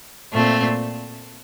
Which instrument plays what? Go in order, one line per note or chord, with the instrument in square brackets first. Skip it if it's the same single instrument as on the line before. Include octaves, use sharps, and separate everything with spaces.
[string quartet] A#2 A3 C4